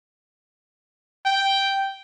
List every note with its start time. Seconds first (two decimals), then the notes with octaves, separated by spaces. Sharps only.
1.26 G5